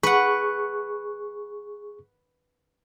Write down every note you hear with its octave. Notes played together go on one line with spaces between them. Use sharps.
G#4 B4 F#5 C#6